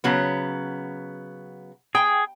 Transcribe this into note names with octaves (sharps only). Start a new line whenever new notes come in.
C#3 F#3 B3
G#4 G5